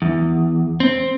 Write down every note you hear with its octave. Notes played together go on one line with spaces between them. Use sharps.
E2
C4